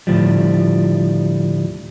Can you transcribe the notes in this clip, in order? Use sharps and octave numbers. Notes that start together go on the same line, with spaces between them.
D2 A2 F3 G3